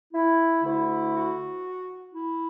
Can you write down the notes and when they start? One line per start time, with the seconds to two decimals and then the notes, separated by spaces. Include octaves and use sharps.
0.13 E4
0.63 D2 D3 A3 E4
1.14 F#4
2.14 E4